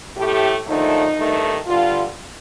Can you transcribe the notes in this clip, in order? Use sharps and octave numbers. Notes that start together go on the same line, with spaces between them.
A2 A3 G4
D#2 D3 F3 A3 D#4
G2 D#3 A3
G2 D3 G3 F4